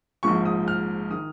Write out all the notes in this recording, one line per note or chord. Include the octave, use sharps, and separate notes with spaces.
A#1 G#2 F3 C#6
D#6
F6
D#3 D#6